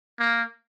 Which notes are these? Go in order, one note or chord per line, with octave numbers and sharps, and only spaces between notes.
A#3